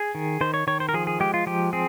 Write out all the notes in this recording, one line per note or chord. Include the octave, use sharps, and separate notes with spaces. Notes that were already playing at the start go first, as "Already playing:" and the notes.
Already playing: G#4
D#3
D#3 C5
C#5
D#3 C#5
C5
A#4
F3 G#4
G#4
G#3 G4
F4
F3 G4
C4 G#4